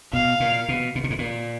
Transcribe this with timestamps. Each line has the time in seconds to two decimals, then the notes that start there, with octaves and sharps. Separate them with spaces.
0.13 B2 F5
0.40 A#2
0.68 B2
0.95 B2
1.04 A#2
1.10 G#2
1.18 A#2